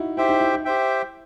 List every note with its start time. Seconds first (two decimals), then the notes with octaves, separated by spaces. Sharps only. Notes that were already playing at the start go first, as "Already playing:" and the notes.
Already playing: D#4 E4 F#4
0.17 E4 G4 C5 E5 G5
0.29 D#4
0.40 E4
0.53 E4
0.65 G4 C5 E5 G5